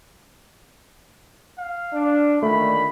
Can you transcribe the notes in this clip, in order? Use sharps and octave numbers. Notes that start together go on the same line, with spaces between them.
F5
D4
A#2 D3 D#3 A3 B5